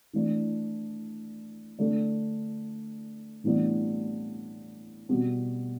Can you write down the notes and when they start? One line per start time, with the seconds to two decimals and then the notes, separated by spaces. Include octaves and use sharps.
0.13 E3 A3 D4
1.78 D3 A3 D4 A4
3.44 A2 E3 G3 B3 D4
5.09 B2 G3 B3 F#4